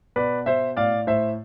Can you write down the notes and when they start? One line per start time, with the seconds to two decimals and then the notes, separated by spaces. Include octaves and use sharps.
0.16 B2 B4 D5
0.46 B2 C5 E5
0.77 A2 D5 F5
1.07 A2 C5 E5